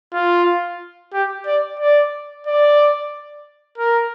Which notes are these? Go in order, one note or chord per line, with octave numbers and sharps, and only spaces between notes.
F4
G4
D5
D5
D5
A#4